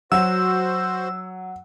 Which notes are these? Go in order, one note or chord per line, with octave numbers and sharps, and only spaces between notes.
F#3 F#4 C5 F#5 E6